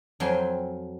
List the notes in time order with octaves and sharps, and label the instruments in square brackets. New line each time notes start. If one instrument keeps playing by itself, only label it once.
[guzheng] F2 F#3 C4 G#5 C6